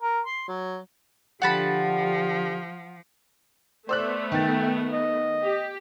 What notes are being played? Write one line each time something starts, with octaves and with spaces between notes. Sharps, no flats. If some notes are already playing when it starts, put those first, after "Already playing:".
A#4
C6
F#3
D3 F3 G4 F#5 A5 B5
A3 B3 C5 D5 E6 F#6
D#3 G5 A6
D#5
G4